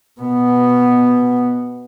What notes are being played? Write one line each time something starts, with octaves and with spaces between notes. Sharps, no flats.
B2 B3